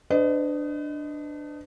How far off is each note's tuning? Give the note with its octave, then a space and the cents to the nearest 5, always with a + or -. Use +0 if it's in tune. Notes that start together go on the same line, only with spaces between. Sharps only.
D4 +10 B4 +45 D#5 +0